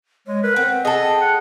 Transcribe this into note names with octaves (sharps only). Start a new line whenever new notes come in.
G#3 C#5
A#4 B4
C4 F#5
G#4 A4 D#5
G5
F#5